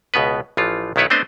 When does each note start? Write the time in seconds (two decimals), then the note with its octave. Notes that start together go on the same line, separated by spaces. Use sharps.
0.14 C#2 B2 B3 B4
0.57 A1 E3 F3 F4
0.96 B1 D#3 B3 E4 B4 C#5
1.10 A3 B3 C4 D4 C5 D#5